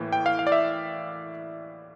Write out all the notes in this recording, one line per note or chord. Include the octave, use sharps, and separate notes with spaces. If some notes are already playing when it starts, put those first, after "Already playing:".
Already playing: A2 E3 A#3
G5
F5
F5
D5
E5